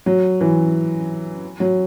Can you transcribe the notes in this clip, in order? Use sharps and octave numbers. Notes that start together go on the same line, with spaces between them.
F#3
E3
F#3